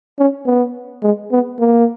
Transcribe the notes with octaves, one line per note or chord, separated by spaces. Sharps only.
C#4
B3
G#3
B3
A#3